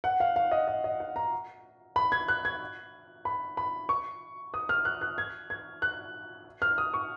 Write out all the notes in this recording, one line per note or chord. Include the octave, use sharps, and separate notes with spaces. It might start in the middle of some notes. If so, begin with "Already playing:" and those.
F#5
F5
F5
D#5
D#5
D#5
F#5
A#5
B5
G#6
F#6
G#6
B5
B5
C#6
D#6
F6
F#6
F#6
G#6
G#6
F#6
F6
D#6
C#6